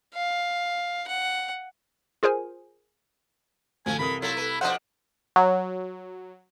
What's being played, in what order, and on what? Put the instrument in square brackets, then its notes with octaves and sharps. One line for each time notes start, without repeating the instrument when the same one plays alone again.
[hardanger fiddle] F5
F#5
[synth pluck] F4 G#4 A#4 C5 G#5
[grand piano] D2 A2 [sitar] F3 A3 [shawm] G#5
[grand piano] C2 A#4 D#6 [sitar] E3 [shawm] B5
[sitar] F#3 A3 [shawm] E4 [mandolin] F4
[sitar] A3 [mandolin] B4
[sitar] B2 F3 D4 [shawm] C5 [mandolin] D#5 F5 F#5
[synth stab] F#3